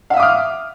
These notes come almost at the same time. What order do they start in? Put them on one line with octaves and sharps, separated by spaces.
F5 E5 D#6 D6 F6